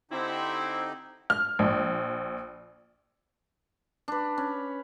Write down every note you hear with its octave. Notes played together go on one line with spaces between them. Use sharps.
D3 C4 D#4 E4 G4
F6
A#1
D4 B4
C#4